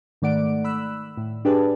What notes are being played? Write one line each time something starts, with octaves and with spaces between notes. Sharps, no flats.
G#2 D#3 A3 D5 F#5 D7
B5 E6 F#6
A2
D4 G4 G#4 B4 A5